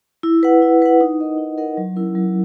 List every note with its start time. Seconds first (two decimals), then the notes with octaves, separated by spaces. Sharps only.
0.23 E4
0.43 B4 F#5
0.62 E4
0.82 B4 F#5
1.01 D#4
1.20 A#4 D#5 F#5
1.38 D#4
1.58 A#4 D#5 F#5
1.77 F#3
1.96 C#4 E4 A#4
2.15 F#3